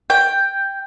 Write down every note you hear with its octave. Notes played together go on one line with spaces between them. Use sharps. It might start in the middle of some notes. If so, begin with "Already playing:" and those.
G5